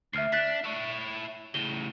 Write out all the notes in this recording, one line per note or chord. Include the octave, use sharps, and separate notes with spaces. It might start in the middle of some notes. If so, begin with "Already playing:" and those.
D2 E5 F6 C7
D4 F#6 A6 B6
E4 C#5
A2 C#3 G7